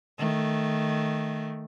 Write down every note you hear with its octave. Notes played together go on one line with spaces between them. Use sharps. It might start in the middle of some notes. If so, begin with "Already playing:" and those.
D#3 A3